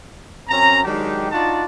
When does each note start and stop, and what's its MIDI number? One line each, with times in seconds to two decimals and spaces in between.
0.49 0.80 42
0.49 0.80 60
0.49 0.80 61
0.49 0.80 82
0.84 1.31 51
0.84 1.31 54
0.84 1.31 56
0.84 1.31 62
0.84 1.31 63
0.84 1.31 67
1.31 1.64 62
1.31 1.64 63
1.31 1.64 65
1.31 1.64 66
1.31 1.64 74
1.31 1.64 81